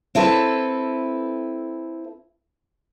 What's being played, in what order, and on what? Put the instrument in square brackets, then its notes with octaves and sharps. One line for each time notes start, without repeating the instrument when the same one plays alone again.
[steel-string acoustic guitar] C4 E4 A4 B4